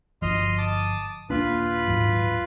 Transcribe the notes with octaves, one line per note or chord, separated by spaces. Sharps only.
G1 F3 D#5 C6 F6
A5 D6 D#6
D#1 A#3 D4 F4 B4 B5
D#1 G#2 F#3